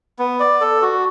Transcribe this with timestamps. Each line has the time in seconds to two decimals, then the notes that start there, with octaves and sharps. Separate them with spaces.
0.19 B3
0.40 D5
0.61 A4
0.82 F#4